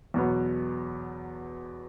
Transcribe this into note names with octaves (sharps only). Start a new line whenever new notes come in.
E2 B2 F#3 B3